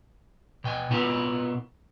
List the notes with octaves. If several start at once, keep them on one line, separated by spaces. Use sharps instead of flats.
B2 G5 G#5
B2 B3 E4 F4 A#4 B4